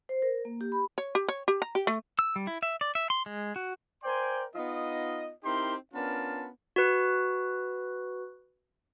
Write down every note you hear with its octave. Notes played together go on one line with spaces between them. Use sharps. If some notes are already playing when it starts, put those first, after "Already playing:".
C5
A#4
A#3
G4
B5
C#5
G4
C#5
G4
A#5
G4
A3
E6
G3
E4
E5
D5
E5
C6
G#3
F#4
A#4 C5 D5 G5 G#5 C6
B3 D#4 F4 D#5
C4 D#4 E4 G4 A#4 C6
B3 C#4 D4 F4 A#4 A5
F#4 B4